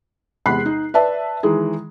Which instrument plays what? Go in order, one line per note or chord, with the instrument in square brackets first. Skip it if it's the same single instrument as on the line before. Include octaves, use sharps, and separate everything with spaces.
[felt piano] E2 C3 G#3 B5 F#6 C7
D#4
B4 D5 E5 A5
D#3 E3 G#3 G#4